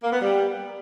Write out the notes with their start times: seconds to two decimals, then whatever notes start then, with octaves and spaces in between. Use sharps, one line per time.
0.03 A#3
0.12 B3
0.21 G3